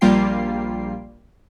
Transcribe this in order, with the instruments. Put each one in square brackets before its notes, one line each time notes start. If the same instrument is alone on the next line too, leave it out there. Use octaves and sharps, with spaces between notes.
[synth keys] A#1 G3 A#3 F4 G5 C7